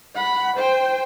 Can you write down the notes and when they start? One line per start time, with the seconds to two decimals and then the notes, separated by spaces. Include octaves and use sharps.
0.15 F#5 B5
0.57 C5 G5